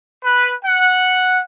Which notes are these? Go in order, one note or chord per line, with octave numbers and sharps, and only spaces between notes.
B4
F#5